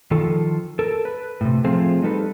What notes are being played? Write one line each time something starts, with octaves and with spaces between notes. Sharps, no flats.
D#3 F3 A4
A4 A#4
B4
A2 C3
F3 A3 C4 F4 G#4 C5
G3 D#4 A4 B4